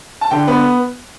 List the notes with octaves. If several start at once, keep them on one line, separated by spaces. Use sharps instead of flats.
A5
D3 G5
B3